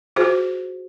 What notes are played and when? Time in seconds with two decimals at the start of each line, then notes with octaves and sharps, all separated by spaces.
0.16 F4 F#4 G#4 C5